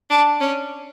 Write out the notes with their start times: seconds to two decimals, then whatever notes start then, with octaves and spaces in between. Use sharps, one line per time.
0.10 D4
0.40 C#4